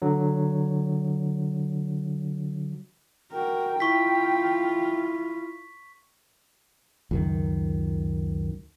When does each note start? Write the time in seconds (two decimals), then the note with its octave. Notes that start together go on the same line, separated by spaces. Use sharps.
0.02 D3 F#3
3.32 F#4 A#4 G5
3.80 E4 F4 C#6 B6
7.11 C#2 F#2 D#3